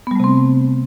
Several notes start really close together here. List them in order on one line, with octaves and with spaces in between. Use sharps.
B3 G3 A3 C3 C4